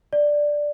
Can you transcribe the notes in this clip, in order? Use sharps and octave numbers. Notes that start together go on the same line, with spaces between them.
D5